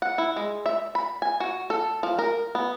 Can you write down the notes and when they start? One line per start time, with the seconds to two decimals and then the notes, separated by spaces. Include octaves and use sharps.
0.02 F#5
0.18 E4
0.36 G#3
0.66 E5
0.95 B5
1.22 G#5
1.40 F#4
1.70 A4
2.03 F3
2.19 A#4
2.55 B3